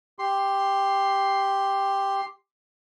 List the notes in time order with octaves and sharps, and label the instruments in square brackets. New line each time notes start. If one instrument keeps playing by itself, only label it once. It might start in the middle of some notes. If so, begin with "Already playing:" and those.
[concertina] G4 C6